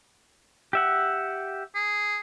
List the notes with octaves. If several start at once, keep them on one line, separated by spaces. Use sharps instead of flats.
G4 E5 F#5
G#4